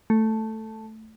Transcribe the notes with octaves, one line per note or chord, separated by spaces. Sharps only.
A3